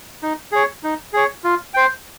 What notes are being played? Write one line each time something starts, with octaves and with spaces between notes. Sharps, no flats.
D#4
G#4 C#5
D#4
G#4 C#5
F4
C5 G5